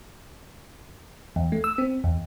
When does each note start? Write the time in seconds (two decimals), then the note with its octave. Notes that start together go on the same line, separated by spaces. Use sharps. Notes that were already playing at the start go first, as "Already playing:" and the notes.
1.36 E2
1.52 A3
1.64 E6
1.78 C4
2.04 E2